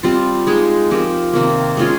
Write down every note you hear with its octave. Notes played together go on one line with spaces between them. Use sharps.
G3 C4 F4
G#3 D#4 G#4
F3 C4 G4 A#4
C3 D#3 A#3
G#3 C#4 F4 G#4